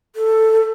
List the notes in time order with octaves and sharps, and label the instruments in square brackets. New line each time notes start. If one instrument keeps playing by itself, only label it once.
[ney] A4